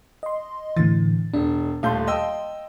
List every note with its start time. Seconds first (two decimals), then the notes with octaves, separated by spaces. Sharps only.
0.23 D#5 C6
0.77 A2 D3 E3 A6
1.34 E1 D4
1.83 D#1 A3 F5 A5 C6 G6
2.07 D#5 G5 E6